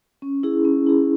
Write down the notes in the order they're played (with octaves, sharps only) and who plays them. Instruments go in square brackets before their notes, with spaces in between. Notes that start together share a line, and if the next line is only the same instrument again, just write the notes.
[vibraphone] C#4
E4 G#4
C#4
E4 G#4